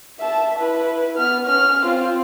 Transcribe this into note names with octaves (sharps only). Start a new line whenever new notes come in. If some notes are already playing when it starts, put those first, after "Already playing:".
E5 A5
E4 B4
B3 F6
C#4 F6
C4 F4